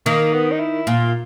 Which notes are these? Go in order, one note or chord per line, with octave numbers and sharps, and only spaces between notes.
D#3 A#3
B3
D#4
E4
A#2 F4